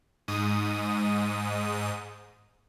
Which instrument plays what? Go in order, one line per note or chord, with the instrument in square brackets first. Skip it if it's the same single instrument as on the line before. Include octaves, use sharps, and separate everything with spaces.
[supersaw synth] G#2 D#6